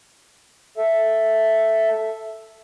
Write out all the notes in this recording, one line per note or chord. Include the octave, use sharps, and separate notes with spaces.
A4 E5